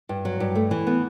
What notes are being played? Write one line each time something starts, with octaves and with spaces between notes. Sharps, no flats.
G2
F#3
G2
A3
E3
B3